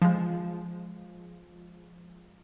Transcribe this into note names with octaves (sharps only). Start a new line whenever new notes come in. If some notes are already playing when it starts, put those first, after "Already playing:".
F3 G#3